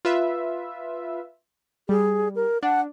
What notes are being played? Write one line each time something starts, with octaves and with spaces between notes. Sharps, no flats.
F4 B4 E5
G3 G#4
A#4
D4 F#5